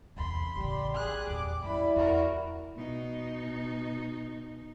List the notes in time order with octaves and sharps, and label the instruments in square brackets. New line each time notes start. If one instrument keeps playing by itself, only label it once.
[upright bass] E2 C3 [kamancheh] B5 C6
[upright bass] A1 C#3 [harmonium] G3 G4
[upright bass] A#3 [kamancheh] G#4 F#6
[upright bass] E2 A#2 [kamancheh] D6
[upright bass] F#2 A3 [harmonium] G3 E4 [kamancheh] B5
[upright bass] E2 [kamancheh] F#4 A#4
[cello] B2 D#4